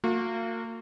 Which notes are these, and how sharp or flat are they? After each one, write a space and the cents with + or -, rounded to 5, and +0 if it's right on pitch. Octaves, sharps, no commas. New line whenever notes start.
A#3 -35 F#4 -45